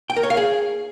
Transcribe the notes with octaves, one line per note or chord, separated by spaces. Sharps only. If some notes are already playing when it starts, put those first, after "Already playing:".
G5
A#4
C#5
F5
G#4